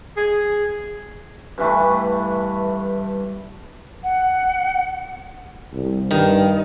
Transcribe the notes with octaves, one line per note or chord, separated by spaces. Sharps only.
G#4
G2 E3 A3
F#5
C2
G2 D#3